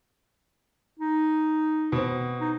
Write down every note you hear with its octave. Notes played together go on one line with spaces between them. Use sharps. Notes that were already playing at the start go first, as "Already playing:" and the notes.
D#4
B2 C4
D#4